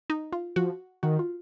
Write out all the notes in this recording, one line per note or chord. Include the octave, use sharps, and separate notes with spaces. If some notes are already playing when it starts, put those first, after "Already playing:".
D#4
F4
F3 F#4
D#3 F#4
F4